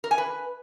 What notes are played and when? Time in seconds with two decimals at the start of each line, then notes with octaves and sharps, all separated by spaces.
0.04 A#4
0.11 G#5
0.18 B4